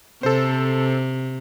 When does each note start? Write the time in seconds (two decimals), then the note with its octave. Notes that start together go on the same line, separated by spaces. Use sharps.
0.23 C3 A4 C5